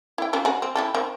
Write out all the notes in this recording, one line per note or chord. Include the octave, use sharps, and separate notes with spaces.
E4 G5
C#4 F4 G4
F#4 G#4
C4
E4 G4 A4
D#3 C4